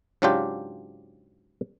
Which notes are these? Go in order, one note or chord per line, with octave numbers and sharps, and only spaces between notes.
G#2 C#3 F#3 D4 F4 G4